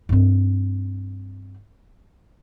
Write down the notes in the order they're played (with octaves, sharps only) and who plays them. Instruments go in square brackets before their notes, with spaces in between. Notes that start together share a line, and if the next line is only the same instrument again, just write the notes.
[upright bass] G2 C4